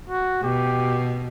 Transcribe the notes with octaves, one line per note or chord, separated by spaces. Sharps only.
F#4
B2 G4